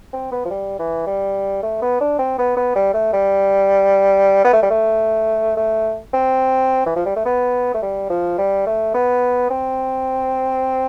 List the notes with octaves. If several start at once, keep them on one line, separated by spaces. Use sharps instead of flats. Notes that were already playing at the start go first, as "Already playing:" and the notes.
C4
B3
F3
G3
E3
G3
A3
B3
D4
C4
B3
B3
G3
A3
G3
B3
A3
G3
A3
A3
C4
E3
F3
G3
A3
B3
A3
G3
F3
G3
A3
B3
C4